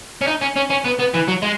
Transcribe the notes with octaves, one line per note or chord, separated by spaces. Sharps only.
C#4
D#4
C#4
C#4
C#4
B3
B3
E3
F#3
G#3